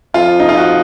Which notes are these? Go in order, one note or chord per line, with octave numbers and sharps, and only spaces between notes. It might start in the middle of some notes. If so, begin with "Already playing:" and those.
F2 F4
D#4
F4
F#4